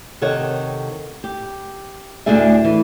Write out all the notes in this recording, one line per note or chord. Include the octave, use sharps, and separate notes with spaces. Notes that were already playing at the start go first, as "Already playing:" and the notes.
C3 D#3 A4 C#5 F#5
G4
D2 A2 D3 D4 G#4 E5
E3